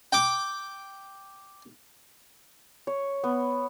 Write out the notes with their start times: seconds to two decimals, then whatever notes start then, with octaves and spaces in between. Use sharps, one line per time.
0.13 G5 D6
2.87 C#5
3.24 B3